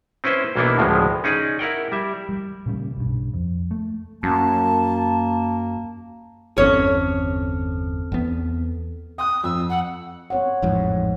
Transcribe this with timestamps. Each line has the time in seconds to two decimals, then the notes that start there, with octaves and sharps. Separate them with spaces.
0.24 C4 C#4 E4 B4 C5
0.56 B1 E3 A#3 B3 D4 E4
0.78 D2 A2 C#3 F3 G#3
1.24 C#4 D#4 G#4 D5
1.59 E4 A#4 F#5 G5
1.92 G3 E5
2.29 G3
2.66 A#2 C#3 G3
2.96 B1 G2
3.34 F2
3.71 A3
4.23 F#2 A#3 A5
6.58 G1 E2 C4 C#4 A4 C#5 F6
8.12 E2 B3
9.18 G5 C6 D#6 F#6
9.44 F2 E6
9.69 F#5
10.30 C4 C#5 F#5
10.62 A1 F2 G#2